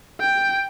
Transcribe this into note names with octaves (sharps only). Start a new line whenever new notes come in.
G5